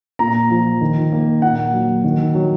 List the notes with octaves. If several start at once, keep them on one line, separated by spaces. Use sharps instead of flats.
A#2 A#5
F3
D#3
A#3
A#2 F#5
F#3
D#3
F#3